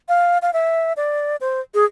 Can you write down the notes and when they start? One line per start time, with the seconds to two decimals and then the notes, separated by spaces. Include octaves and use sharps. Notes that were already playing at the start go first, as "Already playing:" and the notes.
0.09 F5
0.42 F5
0.53 E5
0.97 D5
1.41 C5
1.74 G#4